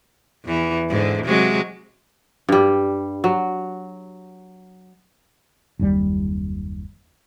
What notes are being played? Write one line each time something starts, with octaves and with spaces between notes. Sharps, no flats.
E2 E3
G#2 D3
C3 F#3 G#3
G2 G3
F#3
F#1 D#2 G3